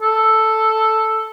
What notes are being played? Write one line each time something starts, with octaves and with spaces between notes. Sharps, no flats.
A4